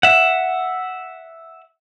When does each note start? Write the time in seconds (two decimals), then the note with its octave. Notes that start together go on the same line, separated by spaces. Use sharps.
0.03 E5 F#5